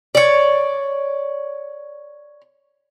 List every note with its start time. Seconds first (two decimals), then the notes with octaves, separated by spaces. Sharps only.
0.15 C#5 D5